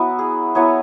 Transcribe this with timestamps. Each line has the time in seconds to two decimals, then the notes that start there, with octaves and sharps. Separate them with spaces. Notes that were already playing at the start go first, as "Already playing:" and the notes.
Already playing: F#3 B3 E4 F#4
0.19 G#4
0.55 F#3 B3 E4 G#4 C#5